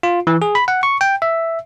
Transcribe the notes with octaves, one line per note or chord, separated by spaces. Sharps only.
F4
E3
G#4
B5
F#5
C#6
G5
E5